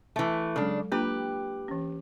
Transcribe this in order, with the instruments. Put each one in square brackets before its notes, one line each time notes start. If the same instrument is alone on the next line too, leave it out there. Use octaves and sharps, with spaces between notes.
[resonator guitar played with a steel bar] E3 A3
[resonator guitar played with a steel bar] C#3 D4 [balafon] F#3 G#3 A4
[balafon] A#3 D4 F4 [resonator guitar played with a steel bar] G4 B4
[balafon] E3 C#4